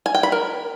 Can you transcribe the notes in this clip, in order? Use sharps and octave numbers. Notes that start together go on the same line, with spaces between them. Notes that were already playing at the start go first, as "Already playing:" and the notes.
G#5
G5
B5
A#4